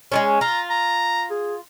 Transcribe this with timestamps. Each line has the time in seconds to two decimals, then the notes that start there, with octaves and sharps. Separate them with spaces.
0.12 G#3 A3 C#4
0.41 F4 A#5
0.70 A#5
1.31 G#4